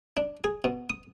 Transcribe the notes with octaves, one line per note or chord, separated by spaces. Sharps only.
D4
G#4
B2
D#6